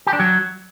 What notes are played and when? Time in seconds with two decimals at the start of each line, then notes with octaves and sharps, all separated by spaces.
0.07 G4
0.13 D4
0.20 F#3